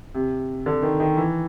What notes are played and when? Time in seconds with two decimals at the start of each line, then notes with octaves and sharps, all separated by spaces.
0.14 C3
0.66 D3
0.82 D#3
1.00 D#3
1.17 E3